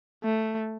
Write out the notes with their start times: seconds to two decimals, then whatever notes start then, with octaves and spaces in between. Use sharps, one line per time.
0.24 A3